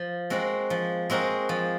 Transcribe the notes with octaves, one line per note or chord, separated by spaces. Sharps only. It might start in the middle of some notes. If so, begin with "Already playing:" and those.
Already playing: F3
G#3 C4 F#4 A#4
F3
G#3 C4 F#4 A#4
F3